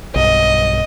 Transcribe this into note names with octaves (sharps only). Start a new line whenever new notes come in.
B1 G2 D#5